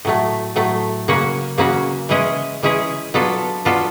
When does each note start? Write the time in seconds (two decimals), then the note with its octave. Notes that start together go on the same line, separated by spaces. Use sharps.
0.05 A2 F#3 A3
0.56 A2 F#3 A3
1.08 C#3 F#3 A#3 C#4 F#4
1.58 C#3 F#3 A#3 C#4 F#4
2.09 E3 G#3 C#4 E4 G#4
2.63 E3 G#3 C#4 E4 G#4
3.14 F#3 B3 D4 F4 A4
3.65 F#3 B3 D4 F4 A4